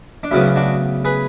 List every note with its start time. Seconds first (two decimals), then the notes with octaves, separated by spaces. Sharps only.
0.23 D4
0.31 D2 C#3 F#3 B3 C#4 E4
0.56 D4 F#4
1.05 G#4 B4